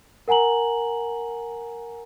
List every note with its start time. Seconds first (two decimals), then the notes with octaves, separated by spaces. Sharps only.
0.28 A#4 F#5 G#5 A#5 F#7